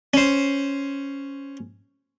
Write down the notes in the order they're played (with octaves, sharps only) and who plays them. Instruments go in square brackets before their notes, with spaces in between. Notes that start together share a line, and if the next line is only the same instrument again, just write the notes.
[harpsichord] C#4 C5